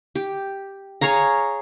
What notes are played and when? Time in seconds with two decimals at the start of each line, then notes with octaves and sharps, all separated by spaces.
0.15 G4
1.01 G#4 C#5 F5 A#5